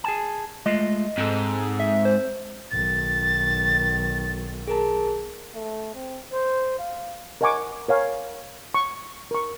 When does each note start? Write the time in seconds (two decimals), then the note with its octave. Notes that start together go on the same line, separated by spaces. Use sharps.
0.04 G#4 G#5 A5
0.66 G#3 A3 F4 D#5
1.18 G#2 C4 A4
1.80 E5
2.05 C5
2.71 B1 D#3 A6
4.68 G#4 A#4 A5
5.54 A3
5.94 C4
6.33 C5
6.79 F5
7.41 A#4 D#5 F#5 G#5 C#6 D6
7.88 A#4 C#5 F5 G#5
8.74 C#6
9.31 A#4 C#6